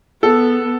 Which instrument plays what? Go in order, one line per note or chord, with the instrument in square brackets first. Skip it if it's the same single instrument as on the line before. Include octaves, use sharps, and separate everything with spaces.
[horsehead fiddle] B3 [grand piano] A4